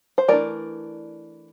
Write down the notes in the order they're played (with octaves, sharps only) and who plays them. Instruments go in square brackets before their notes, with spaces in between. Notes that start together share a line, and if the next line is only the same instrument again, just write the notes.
[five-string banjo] C5
E3 A3 D4 A#4 D5